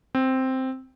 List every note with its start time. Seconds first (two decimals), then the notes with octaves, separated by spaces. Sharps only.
0.15 C4